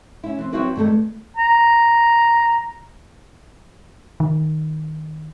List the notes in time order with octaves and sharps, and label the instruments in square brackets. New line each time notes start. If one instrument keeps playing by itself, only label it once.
[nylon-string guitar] C#4 E4
E3 C4
F#3 A3 C4 E4 F#4 B4
G2 D#3 A3 A4
[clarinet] A#5
[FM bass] D#3